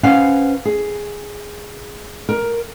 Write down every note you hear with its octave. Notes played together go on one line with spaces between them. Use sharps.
C#4 B4 C5 F5 F#5 G#5
G#4
A#4